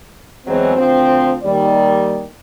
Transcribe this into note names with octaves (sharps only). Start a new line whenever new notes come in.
E2 E3 F#3 G#3 C4
D2 F3 C4
D#2 D#3 G3 D5